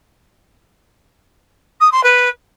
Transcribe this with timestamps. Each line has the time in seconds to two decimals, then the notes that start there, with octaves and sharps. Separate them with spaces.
1.80 D#6
1.92 C6
2.04 B4